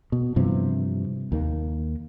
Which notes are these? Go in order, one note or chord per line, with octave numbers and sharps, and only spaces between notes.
B2
G2 C3 E3 F3
D#2 D#3 A#3